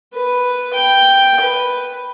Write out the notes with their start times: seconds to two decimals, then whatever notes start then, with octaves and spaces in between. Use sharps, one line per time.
0.14 B4
0.74 G5
1.41 B4